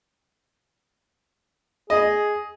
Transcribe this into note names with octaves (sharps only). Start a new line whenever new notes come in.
G#4 D#5